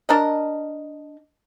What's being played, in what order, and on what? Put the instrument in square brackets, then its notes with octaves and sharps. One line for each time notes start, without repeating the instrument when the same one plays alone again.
[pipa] D4 A#4 D#5